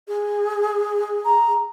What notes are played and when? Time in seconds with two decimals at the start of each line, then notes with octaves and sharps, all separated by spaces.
0.07 G#4
1.25 A#5